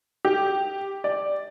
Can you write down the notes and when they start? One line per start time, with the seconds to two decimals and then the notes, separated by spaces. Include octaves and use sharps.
0.25 G4
1.04 D5